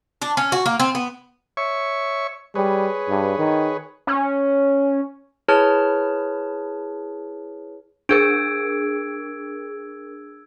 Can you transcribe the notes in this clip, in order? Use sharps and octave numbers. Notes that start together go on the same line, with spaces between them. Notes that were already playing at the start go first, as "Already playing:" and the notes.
D4
C#4
F#4
A#3
C4
B3
C#5 E5 C#6
G3 G#4 B4 C#5
G2
D#3
C#4
E4 G#4 B4 C#5 A5 F6
D4 G#4 A#4 E6 G#6 D7